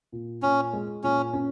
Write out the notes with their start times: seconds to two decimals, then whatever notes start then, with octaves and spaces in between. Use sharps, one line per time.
0.12 A#2
0.43 A#2 C#4
0.73 G#3
1.03 A#2 C#4
1.33 C#4